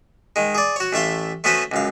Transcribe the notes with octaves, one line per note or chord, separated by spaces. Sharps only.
D#3 G#3
G#4 D5
F#4 C#5
A1 A3 E5 F5 C6
A3 B3 C#4 F#4 B4 C5
C#2 F#2 F5